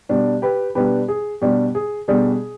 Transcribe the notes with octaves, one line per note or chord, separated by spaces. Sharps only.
B2 G3 D4 G4
G4 B4
B2 G3 D4 G4 B4
G#4
B2 G3 D4 G4
G#4
B2 G3 D4 G#4